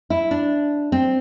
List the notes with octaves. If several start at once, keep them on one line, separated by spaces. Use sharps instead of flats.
E4
D4
C4